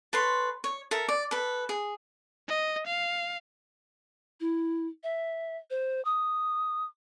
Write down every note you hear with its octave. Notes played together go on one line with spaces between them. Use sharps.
A4 B4 C#5 C6
C#5
A4 A#4 E5
D5
A4 B4
G#4
D#5
F5
E4
E5
C5
D#6